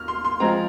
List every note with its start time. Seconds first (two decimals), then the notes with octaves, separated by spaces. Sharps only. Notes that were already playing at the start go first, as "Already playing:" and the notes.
Already playing: D#2 F6
0.08 C6
0.24 C6
0.40 F3 G#3 C4 A#5